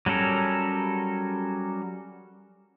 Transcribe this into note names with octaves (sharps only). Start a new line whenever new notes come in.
F#3 G3 C#4 A4 A#4